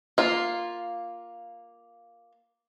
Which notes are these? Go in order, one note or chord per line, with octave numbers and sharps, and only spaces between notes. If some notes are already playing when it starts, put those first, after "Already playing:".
A#3 F4